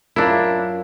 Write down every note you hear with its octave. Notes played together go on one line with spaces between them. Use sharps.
F#2 D4 E4 F4 A#4